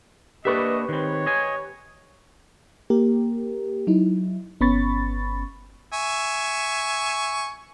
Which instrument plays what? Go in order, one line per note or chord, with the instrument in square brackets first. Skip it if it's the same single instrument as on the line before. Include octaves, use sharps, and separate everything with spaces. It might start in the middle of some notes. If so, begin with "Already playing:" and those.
[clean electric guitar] A#3 D4 E5 [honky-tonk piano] G4 B4 C#6 [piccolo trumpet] D#5
[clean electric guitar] D#3 C4 [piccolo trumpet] C#5
[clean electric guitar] D#5 G#5
[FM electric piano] A#3 G4 A#4
F#3 D#4 E4
G1 B3 C#4 B5 C#6 A6
[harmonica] E5 G#5 C#6